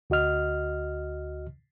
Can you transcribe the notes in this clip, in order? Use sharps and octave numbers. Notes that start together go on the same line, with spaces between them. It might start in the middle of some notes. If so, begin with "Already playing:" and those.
D2 F#4 D#5 F6